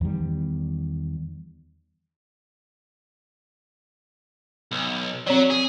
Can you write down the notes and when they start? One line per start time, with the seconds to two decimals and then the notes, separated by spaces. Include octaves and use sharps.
0.01 E2 D#3 G3
4.71 B1
5.27 F#3 C4 C#5 D5
5.50 G#4